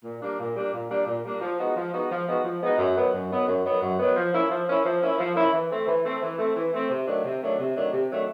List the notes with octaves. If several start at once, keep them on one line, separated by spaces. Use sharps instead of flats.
A#2
G3 A#3 D4
A#2
G3 A#3 D4
A#2
G3 A#3 D4
A#2
G3 A#3 D4
F3
G#3 B3 D#4 F#4
F3
G#3 B3 D#4 F#4
F3
G#3 B3 D#4 F#4
F3
G#3 B3 D#4 F#4
F#2
D#3 F#3 B3
F#2
D#3 F#3 B3
F#2
D#3 F#3 B3
F#2
D#3 F#3 B3
F3
A#3 C#4 E4
F3
A#3 C#4 E4
F3
A#3 C#4 E4
F3
A#3 C#4 E4
E3
A3 C4
E3
A3 C4
E3
A3 C4
E3
A3 C4
C3
D#3 F#3 A3 D4
C3
D#3 F#3 A3 D4
C3
D#3 F#3 A3 D4
C3
D#3 F#3 A3 D4